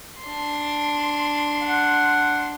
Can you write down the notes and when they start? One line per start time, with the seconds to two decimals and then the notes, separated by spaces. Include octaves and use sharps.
0.22 D4 C6
1.62 F#5